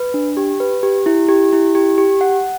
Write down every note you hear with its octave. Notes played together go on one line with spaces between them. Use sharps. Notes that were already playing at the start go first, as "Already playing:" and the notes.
Already playing: B4
D4
G4
B4
G4
E4
G4
E4
G4
G4
F#5